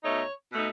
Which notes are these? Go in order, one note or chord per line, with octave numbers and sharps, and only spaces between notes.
B2 A3 D#4 C#5
B2 A3 D#4